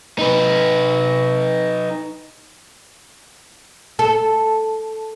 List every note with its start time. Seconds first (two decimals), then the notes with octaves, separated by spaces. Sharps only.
0.19 D#4 B4
3.99 A4